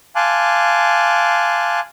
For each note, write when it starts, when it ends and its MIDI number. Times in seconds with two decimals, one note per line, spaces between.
0.16 1.80 77
0.16 1.80 80
0.16 1.80 81
0.16 1.80 84
0.16 1.80 86
0.16 1.80 90